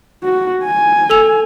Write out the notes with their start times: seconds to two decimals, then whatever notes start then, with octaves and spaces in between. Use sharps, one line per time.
0.23 F#4
0.64 G#5
1.10 A4 E6 F7